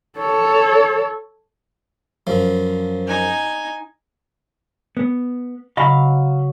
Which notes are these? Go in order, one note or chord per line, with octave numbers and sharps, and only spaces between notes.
A4 C#5
F#2 F3
D#4 G#5
B3
C#3 F#3 D#5 F5 B5